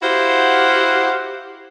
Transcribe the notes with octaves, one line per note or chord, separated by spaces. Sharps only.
E4 F#4 G4 C5 F5 F#5